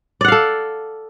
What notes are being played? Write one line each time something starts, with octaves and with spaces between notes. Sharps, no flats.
A4 D5 F5 F#5